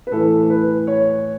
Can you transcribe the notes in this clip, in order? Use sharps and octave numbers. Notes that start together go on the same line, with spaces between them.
B4
A2 E3 A4
B4
C#5